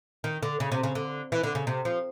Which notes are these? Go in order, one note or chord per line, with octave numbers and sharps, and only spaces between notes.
D#3
D3
C#3
C3
C#3
D3
E3
D3
C#3
C3
F3